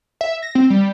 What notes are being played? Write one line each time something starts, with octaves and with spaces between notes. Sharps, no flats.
E5
A#6
C4
G3